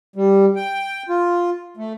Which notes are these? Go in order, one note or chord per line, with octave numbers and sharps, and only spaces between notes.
G3
G5
F4
A3